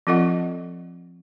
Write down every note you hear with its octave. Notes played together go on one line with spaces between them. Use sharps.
F3 C4 F4 A4 D#5 F#5